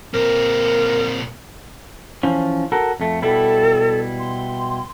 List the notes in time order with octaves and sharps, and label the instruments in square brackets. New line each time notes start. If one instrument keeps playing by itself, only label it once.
[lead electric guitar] A#2 C4 [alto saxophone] A#4
[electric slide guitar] E3 F3 C#4
F#4 A4 A#4
F2 A3
[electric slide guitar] B2 G3 E4 [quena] A4
[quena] C6